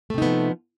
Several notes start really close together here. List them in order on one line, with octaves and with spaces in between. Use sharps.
A3 C3 D#4 B3 F3